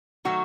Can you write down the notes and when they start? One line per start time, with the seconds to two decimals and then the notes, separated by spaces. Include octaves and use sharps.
0.25 D#3 F#3 A3 F#4